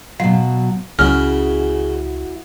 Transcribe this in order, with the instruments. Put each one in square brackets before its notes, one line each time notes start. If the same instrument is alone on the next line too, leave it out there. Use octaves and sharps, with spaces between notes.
[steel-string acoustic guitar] B2 F#3 [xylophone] F5
[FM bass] C#2 [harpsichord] C#3 [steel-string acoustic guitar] E4 F#4 [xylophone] F6